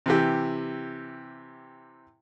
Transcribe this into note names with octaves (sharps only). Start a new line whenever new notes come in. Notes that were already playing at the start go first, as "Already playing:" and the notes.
C3 E3 G4